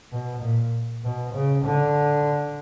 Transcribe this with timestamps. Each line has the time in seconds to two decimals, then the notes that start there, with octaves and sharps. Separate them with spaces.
0.12 B2
0.42 A#2
1.04 B2
1.34 C#3
1.65 D3